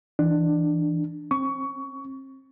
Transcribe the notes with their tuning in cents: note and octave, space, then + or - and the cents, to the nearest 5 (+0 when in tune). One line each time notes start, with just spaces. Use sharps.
E3 +0 D4 +15
C4 +35 C#6 +20